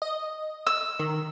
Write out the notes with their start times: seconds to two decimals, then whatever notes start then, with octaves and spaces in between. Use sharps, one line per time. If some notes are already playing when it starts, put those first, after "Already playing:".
0.02 D#5
0.67 E6
0.99 D#3